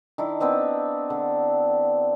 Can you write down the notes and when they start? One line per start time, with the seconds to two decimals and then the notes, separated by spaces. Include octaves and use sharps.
0.18 D#3 D4 E4
0.40 B3 C4 D4 B4
1.10 D3